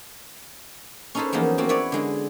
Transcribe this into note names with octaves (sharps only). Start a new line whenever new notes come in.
C#4 D#4 G#4 A4 B4 C5
E2 F3 F#3 A#3 D#4
F3 A#3 C4 F#4
E4 B4 C#5 D5
D3 G#3 G#4